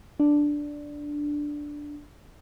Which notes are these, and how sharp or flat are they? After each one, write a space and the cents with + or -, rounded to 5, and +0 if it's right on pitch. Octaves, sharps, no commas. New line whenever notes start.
D4 +0